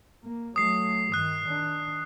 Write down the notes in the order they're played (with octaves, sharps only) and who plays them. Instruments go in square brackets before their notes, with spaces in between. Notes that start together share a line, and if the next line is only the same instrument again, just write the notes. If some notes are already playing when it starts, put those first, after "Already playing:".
[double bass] A#3
[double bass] F#3 A3 [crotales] D#6 C7
[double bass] G2 D#3 [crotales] D#6 F#6
[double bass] D#3 D4